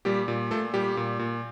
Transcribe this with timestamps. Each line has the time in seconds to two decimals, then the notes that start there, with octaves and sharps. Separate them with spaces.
0.05 A#2 G3 G4
0.28 A#2
0.51 A#2 A3 A4
0.74 A#2 G3 G4
0.97 A#2
1.19 A#2